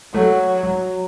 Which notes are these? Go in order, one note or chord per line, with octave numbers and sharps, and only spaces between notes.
F#3 A3
F#3